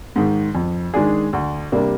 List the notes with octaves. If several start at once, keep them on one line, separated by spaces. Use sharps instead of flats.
G#2 D#3
F2
D#3 G#3 D4 G#4
D2
C3 G3 A#3 D4